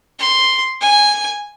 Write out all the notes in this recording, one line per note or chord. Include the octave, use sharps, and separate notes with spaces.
C6
G#5